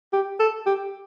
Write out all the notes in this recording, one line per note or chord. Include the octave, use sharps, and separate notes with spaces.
G4
A4
G4